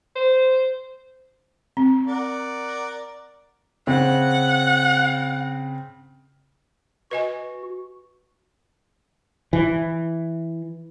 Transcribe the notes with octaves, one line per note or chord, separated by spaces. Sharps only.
C5
C4
A#4 D5 F#5
C#3 C4 F#5
F#4 B4 D#5 G#5
E3